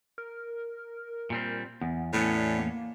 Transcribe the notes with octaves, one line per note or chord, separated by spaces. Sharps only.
A#4
A#2 G3 C4
E2 B3
E2 A2 B3 C#4 D5
A#3